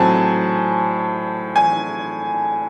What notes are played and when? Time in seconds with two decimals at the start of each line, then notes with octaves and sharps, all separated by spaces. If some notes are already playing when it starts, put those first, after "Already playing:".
Already playing: A2 F#3 C4 G#5 A5
1.56 G#5